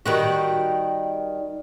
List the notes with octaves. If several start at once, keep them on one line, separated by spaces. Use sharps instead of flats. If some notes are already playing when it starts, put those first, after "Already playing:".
D#3 G3 F#4